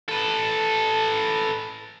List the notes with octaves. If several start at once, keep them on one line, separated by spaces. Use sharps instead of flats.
A4 B4